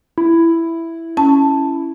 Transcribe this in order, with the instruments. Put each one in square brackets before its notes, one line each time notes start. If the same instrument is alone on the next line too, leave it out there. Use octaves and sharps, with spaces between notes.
[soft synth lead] E4
[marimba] C#4 A5